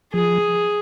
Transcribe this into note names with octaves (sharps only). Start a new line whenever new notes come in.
F3 G#4